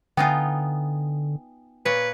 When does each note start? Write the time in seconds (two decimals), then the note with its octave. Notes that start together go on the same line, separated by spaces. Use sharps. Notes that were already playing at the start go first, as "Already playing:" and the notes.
0.17 D3 B3 D#4 F4 G5 G#5
1.86 A#2 B4 C#5